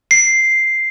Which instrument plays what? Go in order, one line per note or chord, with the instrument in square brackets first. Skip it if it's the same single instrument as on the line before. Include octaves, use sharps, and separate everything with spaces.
[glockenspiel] C7